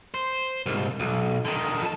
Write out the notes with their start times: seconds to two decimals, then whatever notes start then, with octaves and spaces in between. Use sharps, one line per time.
0.14 C5
0.66 C2 G#2
1.00 B1
1.45 D3 D#3
1.81 F2 A5